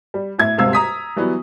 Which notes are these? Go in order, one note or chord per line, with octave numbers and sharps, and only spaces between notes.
G3
A2 E4 G#6
D#1 G#2 C3 F5 E6 G#6
A#5 D#6 B6
E3 F#3 G3 B3